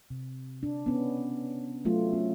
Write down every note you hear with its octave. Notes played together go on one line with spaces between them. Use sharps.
C3
D4
B3 C#4
F#3 A3 F4
C#4